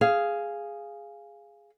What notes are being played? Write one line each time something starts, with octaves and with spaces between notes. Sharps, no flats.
G#4 F5